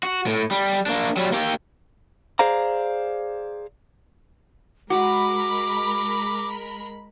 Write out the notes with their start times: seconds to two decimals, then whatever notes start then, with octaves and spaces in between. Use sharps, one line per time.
0.03 F#4
0.27 A2
0.51 G3
0.86 A#3 D4
1.17 F#3 G3
1.32 A#3 G4
2.39 G#4 C5 D5 F5 A#5
4.90 G#3 F#4 A#4 B5 D6